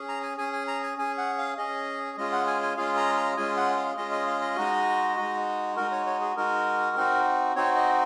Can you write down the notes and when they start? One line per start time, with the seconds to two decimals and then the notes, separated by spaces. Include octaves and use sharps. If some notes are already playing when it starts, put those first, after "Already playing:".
Already playing: C#4 G#4
0.09 A#5
0.23 G#5
0.38 C#4 G#4 G#5
0.53 G#5
0.68 A#5
0.83 G#5
0.98 C#4 G#4 G#5
1.18 F#5
1.38 F5
1.57 C#4 G#4 D#5
2.17 G#3 C#4 F4 G#4 D#5
2.32 F#5
2.47 G#5
2.63 G#5
2.77 G#3 C#4 F4 G#4 F5
2.97 A#5
3.17 A#5
3.37 G#3 C#4 F4 G#4 G#5
3.57 F#5
3.77 F5
3.96 G#3 C#4 F4 G#4 D#5
4.11 D#5
4.27 F5
4.42 D#5
4.57 G#3 D#4 F#4
5.17 G#3 D#4 F#4
5.77 G#3 D#4 F#4 A#4
5.91 C#5
6.06 C#5
6.21 G#4
6.37 G#3 D#4 F#4 A#4
6.96 C4 D#4 F#4
7.56 C4 D#4 F#4 C#5
7.77 D#5